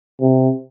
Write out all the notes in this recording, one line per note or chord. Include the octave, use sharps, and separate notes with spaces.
C3